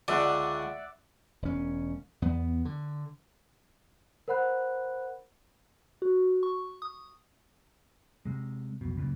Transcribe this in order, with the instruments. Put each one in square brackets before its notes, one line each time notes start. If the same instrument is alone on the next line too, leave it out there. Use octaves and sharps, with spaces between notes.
[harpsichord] C#2 D3 [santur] D5 E5 F#5
[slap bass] E1 C#4
E2 B3
D3
[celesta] A#4 C5 F#5 B5 F#6
[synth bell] F#4
C#6
D#6
[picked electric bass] C3 G#3
F1 B1 B2
C#2 F#2 A#2